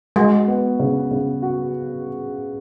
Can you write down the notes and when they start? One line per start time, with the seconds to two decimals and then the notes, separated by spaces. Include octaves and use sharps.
0.16 G#3 F#4
0.48 B3
0.80 C#3
1.11 C#3
1.42 F#4